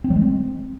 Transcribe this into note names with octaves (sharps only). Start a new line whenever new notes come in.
C4
F#3
G#3
C4